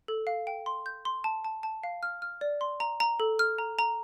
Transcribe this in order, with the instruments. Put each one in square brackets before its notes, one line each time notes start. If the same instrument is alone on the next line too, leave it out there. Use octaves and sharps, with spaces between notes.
[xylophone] A4
F5
G5
C6
G6
C6
A5
A5
A5
F5
F6
F6
D5
C6
A#5
A#5
A4
F6
A#5
A#5